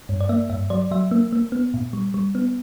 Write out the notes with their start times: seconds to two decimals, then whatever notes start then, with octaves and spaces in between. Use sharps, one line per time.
0.09 G2
0.20 D5
0.29 A#3 E5
0.50 G2 E5
0.70 F#3 D5
0.91 F#3 E5
1.11 A#3
1.33 A#3
1.52 B3
1.74 A#2
1.93 G3
2.14 G3
2.35 B3